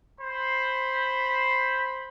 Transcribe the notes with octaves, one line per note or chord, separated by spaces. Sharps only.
C5 B5